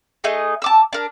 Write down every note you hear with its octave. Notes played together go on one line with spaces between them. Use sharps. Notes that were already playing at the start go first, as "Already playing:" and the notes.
A3 D#4 G#4 D#5
A5 D6 E6
D4 A#4